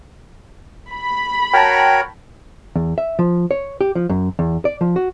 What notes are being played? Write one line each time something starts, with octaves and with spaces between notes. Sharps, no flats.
B5
F#4 A#4 C#5 G5 A5
E2
E5
F3
C#5
G4
F3
F#2
E2
D5
F3
F#4